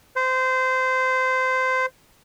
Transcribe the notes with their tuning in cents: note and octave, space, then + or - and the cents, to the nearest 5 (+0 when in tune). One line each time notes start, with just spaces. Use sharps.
C5 -20